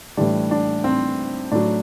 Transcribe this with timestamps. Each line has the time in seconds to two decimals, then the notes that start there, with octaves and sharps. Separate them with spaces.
0.17 A2 E3 G3 D4
0.51 D4
0.84 C4
1.52 A2 F#3 D4